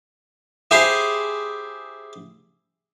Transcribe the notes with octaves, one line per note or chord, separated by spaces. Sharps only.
E4 G4 G#4 C5 C6